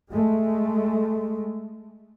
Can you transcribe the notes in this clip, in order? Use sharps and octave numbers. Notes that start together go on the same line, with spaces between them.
G#3 A3